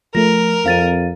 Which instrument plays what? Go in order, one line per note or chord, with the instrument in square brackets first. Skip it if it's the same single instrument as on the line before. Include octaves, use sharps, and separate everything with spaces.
[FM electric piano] F3 A3 [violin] A#4 [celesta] A#6
[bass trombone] F2 [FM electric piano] C4 [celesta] F5 A6 D#7